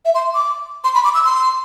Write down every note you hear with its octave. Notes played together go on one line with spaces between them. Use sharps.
E5
C6
D6
C6
B5
D6
E6
C6